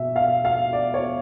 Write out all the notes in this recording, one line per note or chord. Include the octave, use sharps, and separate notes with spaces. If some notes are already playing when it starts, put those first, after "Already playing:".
Already playing: B2 E5
F5
F5
D5
C#5